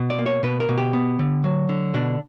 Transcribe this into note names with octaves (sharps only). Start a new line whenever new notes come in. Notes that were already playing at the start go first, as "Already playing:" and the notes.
Already playing: B2
D5
A#3
C#5
B2 B4
A#4
B2
G4
B3
D3
F#3
D3
B2 D4